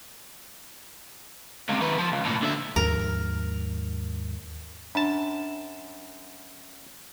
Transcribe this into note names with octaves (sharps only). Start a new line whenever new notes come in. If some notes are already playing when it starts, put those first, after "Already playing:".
C#2 C3
D#3 B4
F3
C#2
A2 A#3
D3 E5
D#2 G#2 F3 A#4
F#2 D4 A5